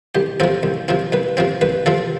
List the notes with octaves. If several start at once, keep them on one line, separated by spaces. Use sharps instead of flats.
C2 G4
C3 F3 C4 A4
C2
C3 F3 C4
C2 B4
C3 F3 C4
C2 B4
C3 F3 C4 A4